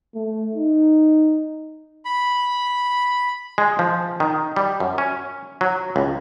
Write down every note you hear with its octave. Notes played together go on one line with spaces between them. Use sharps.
A3
D#4
B5
G#3
F3
D#3
G3
F#2
C#4
F#3
C#2